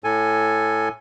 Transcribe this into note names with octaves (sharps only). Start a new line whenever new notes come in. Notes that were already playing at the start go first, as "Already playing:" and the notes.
A2 A4 G#5